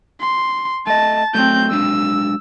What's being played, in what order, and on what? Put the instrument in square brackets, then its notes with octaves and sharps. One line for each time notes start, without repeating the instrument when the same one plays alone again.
[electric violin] C6
[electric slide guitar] A3 D#5 [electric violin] A5
[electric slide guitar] F#3 A3 A4 [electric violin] C4 G6
[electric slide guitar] F#3 G#3 D4 [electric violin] E6